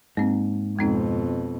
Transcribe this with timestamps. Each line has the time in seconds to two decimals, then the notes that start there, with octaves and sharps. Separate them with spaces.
0.17 G#2 A#3 C4
0.79 F2 B2 G#3 C4 D#4